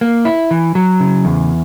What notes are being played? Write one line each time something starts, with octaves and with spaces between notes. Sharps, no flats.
A#3
E4
E3
F#3
C#3
E2